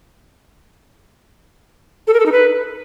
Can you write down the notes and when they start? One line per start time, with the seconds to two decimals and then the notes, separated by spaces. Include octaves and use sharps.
2.07 A4
2.14 A#4
2.20 A4
2.26 D#4
2.32 B4